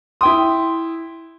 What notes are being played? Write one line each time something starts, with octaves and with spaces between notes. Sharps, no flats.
E4 G5 C6 D#6